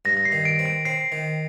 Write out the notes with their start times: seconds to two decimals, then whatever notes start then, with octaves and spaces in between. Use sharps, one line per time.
0.05 G2 A#6
0.17 A#6
0.25 C7
0.32 D#3
0.45 D7
0.59 C4
0.66 D7
0.85 C4 C7
1.12 D#3